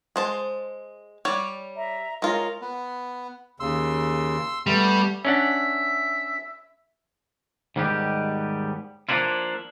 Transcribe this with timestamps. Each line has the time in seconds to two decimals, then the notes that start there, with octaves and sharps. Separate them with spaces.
0.16 G#3 C5 A5
1.25 G3 C#5 D5
1.76 E5 A#5
2.22 G#3 F4 A#4 C#5 A#5
2.61 B3
3.60 D#2 C#3 C6 E6
4.67 G3 A3 B3
5.25 C#4 D4 E5 F#5
7.76 D#2 G#2 G3 B3 G4
9.09 F3 F#3 A#3 D4 E4 F4